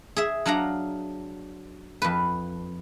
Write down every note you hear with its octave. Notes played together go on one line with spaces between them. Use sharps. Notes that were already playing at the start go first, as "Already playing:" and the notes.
G#4 E5
F#3 D4 F5 F#5 A#5
F2 B4